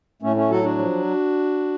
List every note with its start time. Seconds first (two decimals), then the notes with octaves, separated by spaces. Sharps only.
0.22 A2 A3 C#4
0.36 A3 C#4
0.50 F#3 F#4 A4
0.64 D4 F#4
0.78 F3